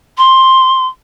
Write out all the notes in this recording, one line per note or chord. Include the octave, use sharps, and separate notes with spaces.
C6